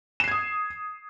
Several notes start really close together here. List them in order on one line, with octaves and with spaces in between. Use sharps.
E7 C7 G#6 D#6